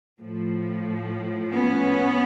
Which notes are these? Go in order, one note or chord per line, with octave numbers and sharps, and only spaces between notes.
A2 F3
B3 C#4